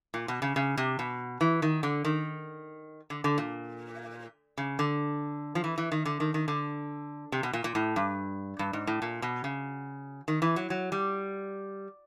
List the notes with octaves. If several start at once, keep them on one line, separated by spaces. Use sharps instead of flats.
A#2
B2
C#3
C#3
C3
B2
E3
D#3
D3
D#3
D3
D3
A#2
C#3
D3
F3
E3
E3
D#3
D3
D#3
D#3
D3
C3
B2
A#2
A#2
A2
G2
G2
G#2
A2
A#2
B2
C#3
D#3
E3
F#3
F#3
G3